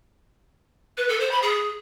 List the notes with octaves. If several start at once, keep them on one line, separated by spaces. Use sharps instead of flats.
B4
A4
C5
B5
G#4